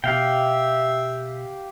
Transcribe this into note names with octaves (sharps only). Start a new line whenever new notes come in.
B2 G4 E5 F5 G5